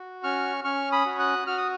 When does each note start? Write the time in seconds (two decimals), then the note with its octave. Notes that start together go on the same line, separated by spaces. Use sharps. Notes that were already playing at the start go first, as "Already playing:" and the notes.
Already playing: F#4
0.23 C#4 C#6 F6
0.64 C#4 C#6 F6
0.92 B5 D#6
1.06 F#4
1.19 D#6 F#6
1.47 F#4 F6
1.57 D#6